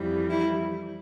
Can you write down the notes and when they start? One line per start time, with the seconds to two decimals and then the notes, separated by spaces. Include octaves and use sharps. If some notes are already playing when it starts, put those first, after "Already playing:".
Already playing: F2 E3 G3
0.30 E4